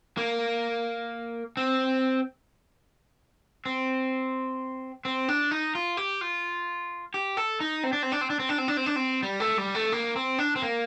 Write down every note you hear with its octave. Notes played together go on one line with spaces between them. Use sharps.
A#3
C4
C4
C4
D4
D#4
F4
G4
F4
G4
A4
D#4
C4
D4
C4
D4
C4
D4
C4
D4
C4
D4
C4
D4
C4
G3
A3
G3
A3
A#3
C4
D4
C4
A#3